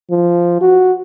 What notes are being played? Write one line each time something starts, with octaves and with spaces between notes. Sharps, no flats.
F3
F#4